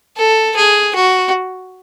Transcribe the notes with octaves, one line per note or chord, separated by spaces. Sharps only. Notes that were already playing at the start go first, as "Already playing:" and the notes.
A4
G#4
F#4